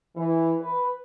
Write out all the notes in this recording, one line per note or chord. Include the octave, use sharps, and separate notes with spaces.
E3
B4